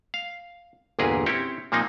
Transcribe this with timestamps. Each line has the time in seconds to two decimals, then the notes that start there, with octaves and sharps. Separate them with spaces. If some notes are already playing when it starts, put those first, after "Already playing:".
0.14 F5
0.99 G1 E2 A#2 G#4 A#4 B4
1.26 C4 C#4 E4 G4 C#5
1.72 A#2 F3 A#3 C4 D#4